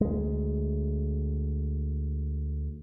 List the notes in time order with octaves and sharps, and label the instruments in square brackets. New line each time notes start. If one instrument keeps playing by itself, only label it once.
[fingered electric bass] D2 G#3